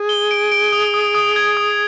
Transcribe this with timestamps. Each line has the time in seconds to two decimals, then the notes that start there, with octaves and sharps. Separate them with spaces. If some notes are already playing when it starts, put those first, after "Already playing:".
Already playing: G#4
0.09 G7
0.31 D7
0.52 D7
0.72 D#6
0.94 D#6
1.15 D#6
1.36 G#6
1.57 D#6